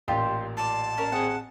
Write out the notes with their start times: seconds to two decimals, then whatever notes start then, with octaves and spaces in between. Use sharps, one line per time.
0.08 A1 A#2 F4 G4 C5
0.57 F4 D5 A5
0.98 C#4 D4 A#4
1.12 C4 G#4 F#5 C#7